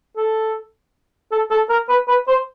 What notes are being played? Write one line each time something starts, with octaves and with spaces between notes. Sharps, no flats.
A4
A4
A4
A#4
B4
B4
C5